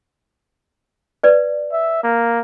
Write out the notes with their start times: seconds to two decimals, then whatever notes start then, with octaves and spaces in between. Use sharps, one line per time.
1.23 B4 D5
1.72 E5
2.03 A#3